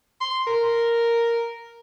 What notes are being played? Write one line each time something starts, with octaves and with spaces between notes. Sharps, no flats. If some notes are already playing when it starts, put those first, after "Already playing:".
C6
A#4